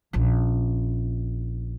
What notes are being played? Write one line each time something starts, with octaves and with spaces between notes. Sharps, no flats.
A#1 C#4